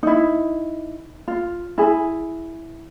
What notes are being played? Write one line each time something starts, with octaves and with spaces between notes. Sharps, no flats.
D#4 E4
F4
E4 G#4